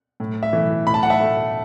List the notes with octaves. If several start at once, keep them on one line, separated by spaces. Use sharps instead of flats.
A2
E5
E3 A3
A2 B5
A5
F#5
E5 A5
A3